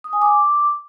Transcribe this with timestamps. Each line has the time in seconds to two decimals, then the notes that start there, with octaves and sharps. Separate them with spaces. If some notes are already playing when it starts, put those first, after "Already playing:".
0.04 D#6
0.13 G#5
0.22 D6